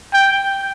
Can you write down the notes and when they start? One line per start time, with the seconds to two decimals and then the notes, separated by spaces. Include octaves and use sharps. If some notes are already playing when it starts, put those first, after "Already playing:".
0.13 G5